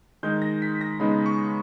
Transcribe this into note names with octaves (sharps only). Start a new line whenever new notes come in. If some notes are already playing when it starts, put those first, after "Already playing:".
D#3 G#3 D#4 G6
A#6
B6
A#6
C#3 G#3 B3 D#4 B5
C#6